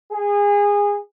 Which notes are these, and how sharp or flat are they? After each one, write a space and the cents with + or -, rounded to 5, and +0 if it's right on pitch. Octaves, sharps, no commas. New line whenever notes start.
G#4 -25